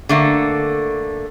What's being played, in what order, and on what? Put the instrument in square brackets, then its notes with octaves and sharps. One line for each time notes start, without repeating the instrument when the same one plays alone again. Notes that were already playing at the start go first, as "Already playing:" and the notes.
[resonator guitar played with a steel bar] D3 A3 A#3